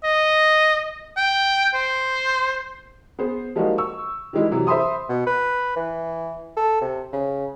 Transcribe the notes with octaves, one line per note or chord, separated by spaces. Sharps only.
D#5
G5
C5
B3 G#4 C5
F3 G3 G#3 A#3 D#4 F#4
C#6 E6
D#3 E3 G3 G#3 D#4 E4
C3 E3 F#3
C5 E5 B5 C6 D#6
B2
B4
E3
A4
C3
C#3